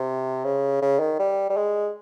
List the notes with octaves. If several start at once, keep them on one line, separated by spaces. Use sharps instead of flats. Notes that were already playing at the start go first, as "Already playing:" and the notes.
Already playing: C3
C#3
C#3
D#3
G3
G3
G#3